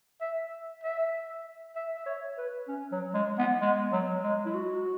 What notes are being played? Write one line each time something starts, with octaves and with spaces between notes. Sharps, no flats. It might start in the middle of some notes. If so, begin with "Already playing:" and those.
E5
E5
E5
E5
C#5
B4
C#4
F#3
G#3
B3
G#3
F#3
G#3
E4
F#4